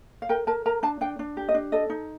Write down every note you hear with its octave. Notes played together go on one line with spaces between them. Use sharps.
F5
A#4 G5
A#4 A5
A#4 A#5
D4 A5
D4 G5
D4
G4
D#5
D4
A4 D#5
D#4